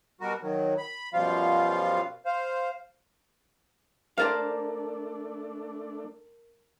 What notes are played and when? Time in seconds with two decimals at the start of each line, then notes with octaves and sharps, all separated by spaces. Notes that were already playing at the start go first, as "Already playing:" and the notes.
0.20 B2 G3 F#4 A#4
0.41 D#3 F#3
0.78 B5
1.13 F#2 B2 F3 G3 F4 F5
2.25 C5 F5
4.18 A3 D4 A#4 C5 D5 F5 A5